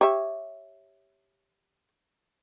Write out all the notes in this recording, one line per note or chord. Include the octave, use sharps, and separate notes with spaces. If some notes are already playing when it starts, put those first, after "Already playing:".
G4 C#5 E5